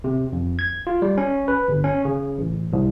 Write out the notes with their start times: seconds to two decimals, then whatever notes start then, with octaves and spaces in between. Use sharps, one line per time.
0.04 C3
0.33 F2
0.59 G#6
0.87 F4
1.02 G3
1.18 C#4
1.48 B4
1.68 G1
1.84 C#4
2.05 C#3
2.38 A1
2.73 C2